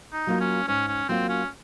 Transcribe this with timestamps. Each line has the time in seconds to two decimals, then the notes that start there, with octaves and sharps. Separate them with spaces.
0.13 D#4
0.27 F#3 A#3 F4
0.41 C#4
0.68 G#2 C#4
0.88 C#4
1.09 F#3 A#3 C4 F4
1.29 C#4